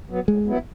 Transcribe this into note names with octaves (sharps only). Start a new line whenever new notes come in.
F#3 B3
A2 G#3
F#3 B3 E4